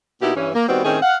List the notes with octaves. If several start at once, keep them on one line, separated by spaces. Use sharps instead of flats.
B2 A#3 D#4 E4 F#4 G4
G2 E3 C#4
A#3
D#3 G3 B3 C4 F#4 B4
A2 D#3 C4 C#4 G#4
F5 F#5